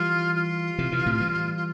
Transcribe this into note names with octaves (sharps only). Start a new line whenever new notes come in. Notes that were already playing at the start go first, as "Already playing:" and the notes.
Already playing: E3 G3 F4
F4
C3 E3
C3 E3
A2 C3
E3 G3
F4